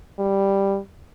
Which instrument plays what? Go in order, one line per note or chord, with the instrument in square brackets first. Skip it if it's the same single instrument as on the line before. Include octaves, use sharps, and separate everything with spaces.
[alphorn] G3